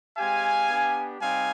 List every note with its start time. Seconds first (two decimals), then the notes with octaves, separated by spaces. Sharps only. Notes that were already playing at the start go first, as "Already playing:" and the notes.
0.17 G#3 C4 G4 F5 G#5
0.69 B3 D4 G4
1.20 G3 C4 D#4 F5 G#5